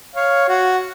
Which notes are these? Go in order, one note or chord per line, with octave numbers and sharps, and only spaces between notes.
C#5 F5
F#4